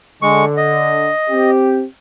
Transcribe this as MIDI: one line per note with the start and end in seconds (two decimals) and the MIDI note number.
0.22 1.10 50
0.22 0.45 56
0.22 0.45 85
0.57 1.51 75
1.30 1.85 60
1.30 1.85 67